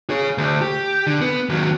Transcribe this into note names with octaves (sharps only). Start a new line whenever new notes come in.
G#4 C#5
D2
G4
D3
B3
D#2 F#3